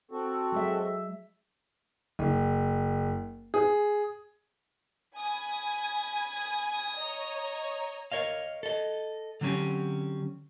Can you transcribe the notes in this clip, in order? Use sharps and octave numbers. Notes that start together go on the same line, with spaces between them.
C4 F#4 A4
F#3 G#3 E5
F#1
G#4
G#5 B5 D#6 G#6
C#5 D#5 A#5
A#4 C#5 D#5 F5
A4 D#5
D3 F#3 C4 C#4 G4